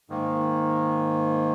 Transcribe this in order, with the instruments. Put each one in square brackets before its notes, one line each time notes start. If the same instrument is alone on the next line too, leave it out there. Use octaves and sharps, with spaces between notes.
[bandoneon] G#2 D#3 A#3